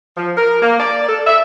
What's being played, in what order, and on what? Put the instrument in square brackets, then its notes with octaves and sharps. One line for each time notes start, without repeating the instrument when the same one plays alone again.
[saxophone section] F3
A#4
A#3
D5
A4
E5